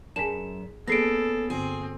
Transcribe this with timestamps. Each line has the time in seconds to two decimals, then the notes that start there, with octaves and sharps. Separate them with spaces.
0.16 F#2 G#4 G#5 A5 B6 E7
0.87 A#3 B3 C#4 G#4 A4 A#6 C7 D7
1.50 G2 D3 C4 G#4